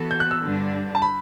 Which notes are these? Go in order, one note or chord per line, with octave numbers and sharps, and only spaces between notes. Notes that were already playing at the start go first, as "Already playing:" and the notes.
Already playing: E3 B3 F#4 A4
G6
F#6
E6
G2 D3 G3 D4
A5
B5